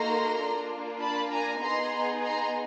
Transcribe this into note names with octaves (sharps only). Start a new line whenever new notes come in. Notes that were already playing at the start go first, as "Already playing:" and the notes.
Already playing: A#3 D#4 F#4 A4 A#5 C6
A#3 D4 F4
A5 B5
G#5 A#5
B3 D#4 G#4 A#5 C6
A#5 C6